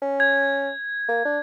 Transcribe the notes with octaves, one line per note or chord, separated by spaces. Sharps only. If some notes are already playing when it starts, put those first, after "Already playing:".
C#4
G#6
A#3
D4